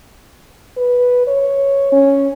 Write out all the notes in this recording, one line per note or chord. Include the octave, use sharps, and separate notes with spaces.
B4
C#5
C#4